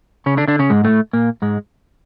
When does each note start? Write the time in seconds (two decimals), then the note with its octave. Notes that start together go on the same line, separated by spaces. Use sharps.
0.26 C#3 C#4
0.37 D3 D4
0.48 D3 D4
0.59 C#3 C#4
0.70 G#2 G#3
0.84 A2 A3
1.13 A#2 A#3
1.42 G#2 G#3